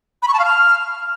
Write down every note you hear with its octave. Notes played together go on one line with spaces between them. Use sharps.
B5
C#6
A5
F5
F6